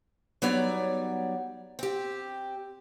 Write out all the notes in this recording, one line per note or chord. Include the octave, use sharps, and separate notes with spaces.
F#3 G3 B3 D#4 C#5 D5
C4 G4